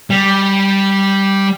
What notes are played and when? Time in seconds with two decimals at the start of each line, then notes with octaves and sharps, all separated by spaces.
0.10 G3